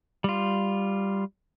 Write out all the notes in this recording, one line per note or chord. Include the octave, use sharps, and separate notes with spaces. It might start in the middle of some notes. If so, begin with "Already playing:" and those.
G3 F4